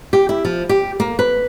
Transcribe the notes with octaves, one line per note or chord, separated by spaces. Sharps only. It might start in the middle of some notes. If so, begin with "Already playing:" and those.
G4
E4
F3
G4
A#3
B4